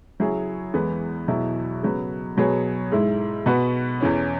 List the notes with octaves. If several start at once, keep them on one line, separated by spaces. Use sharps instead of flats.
C#3 F#3 E4 G#4 C#5
E2 E3 G#3 B3
E2 B2 F#3 E4
C#3 F#3 B3
B2 F#3 B3 G#4 C#5
G#2 G#3 E4
B2 B3 F#4 B4
E2 E3 C#4